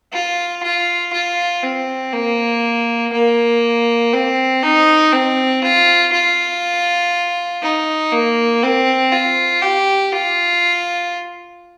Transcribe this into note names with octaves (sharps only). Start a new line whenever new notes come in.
F4
F4
F4
C4
A#3
A#3
C4
D#4
C4
F4
F4
D#4
A#3
C4
F4
G4
F4